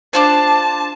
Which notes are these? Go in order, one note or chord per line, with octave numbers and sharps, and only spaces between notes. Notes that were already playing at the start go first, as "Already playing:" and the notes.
D4 F4 C5 A5